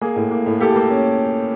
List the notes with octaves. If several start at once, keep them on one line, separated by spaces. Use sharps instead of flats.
A#3 G#4
A2
A#3
A2
A#3 G4 A4
A#3
C#4